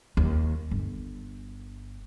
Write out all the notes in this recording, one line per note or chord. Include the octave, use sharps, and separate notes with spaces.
D#2
G1